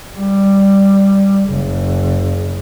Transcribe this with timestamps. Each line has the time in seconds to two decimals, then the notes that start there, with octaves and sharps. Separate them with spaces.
0.16 G3
1.50 F#1